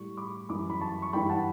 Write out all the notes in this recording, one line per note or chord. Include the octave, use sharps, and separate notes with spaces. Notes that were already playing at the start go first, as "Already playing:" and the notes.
Already playing: A2 G3 C#6
B5 D6
F#2 E3 G3 B5 D6
B5
A5 C#6
C#6
G2 E3 G3 G5 B5
F#5 A5